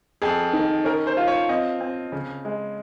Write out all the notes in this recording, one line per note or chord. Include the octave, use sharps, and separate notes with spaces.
F2 G#4
D#3
C#4 A#4
C5
F4
C#5
C4 D#5
C4
C#3
G#3